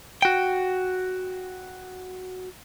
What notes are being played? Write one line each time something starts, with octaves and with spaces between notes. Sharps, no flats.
F#4 G5